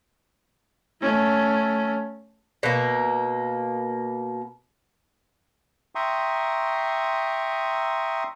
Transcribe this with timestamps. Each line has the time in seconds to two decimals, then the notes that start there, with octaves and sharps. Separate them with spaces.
1.02 A3 C#4
2.63 B2 A#3
5.95 E5 G5 A#5 C6 C#6 D#6